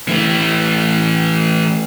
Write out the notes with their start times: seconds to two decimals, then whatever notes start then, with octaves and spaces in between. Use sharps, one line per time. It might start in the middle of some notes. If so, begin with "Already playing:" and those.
0.08 E3 A3